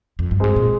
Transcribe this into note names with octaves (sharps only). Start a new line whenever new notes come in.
F2
G2
G#2 G#3 C4
A#2